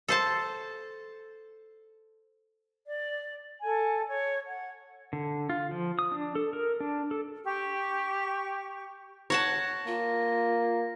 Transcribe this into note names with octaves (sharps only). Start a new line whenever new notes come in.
A4 C5 A5
D5
A4 G#5
C#5
F#5
D3
F4
F3
D#6
D4
A4
A#4
D4
A4
G4 C#6
C#5 F#5 A5 A#6
A#3 F4